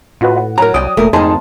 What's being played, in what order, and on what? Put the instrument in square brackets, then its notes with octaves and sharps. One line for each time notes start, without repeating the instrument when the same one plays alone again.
[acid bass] A2 [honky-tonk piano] F4 F#4 B4
[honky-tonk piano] F#5
[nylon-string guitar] F#3 [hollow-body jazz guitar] A#4 A#5
[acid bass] C2 [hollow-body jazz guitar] D5 G5 [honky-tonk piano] D#6
[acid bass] E1 [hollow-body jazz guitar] A#2 A#4 [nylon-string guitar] A3
[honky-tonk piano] G#1 A5 C6 [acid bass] F2 [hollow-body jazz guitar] D#3 G#4 [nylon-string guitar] D#4